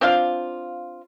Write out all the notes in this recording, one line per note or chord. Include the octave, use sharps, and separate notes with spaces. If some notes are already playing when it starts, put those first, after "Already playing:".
C4 D4 F4 F5